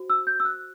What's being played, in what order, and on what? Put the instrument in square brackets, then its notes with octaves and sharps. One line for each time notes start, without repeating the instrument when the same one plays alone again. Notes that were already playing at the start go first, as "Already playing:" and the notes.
Already playing: [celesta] F#4 C5
E6
G6
E6
F#6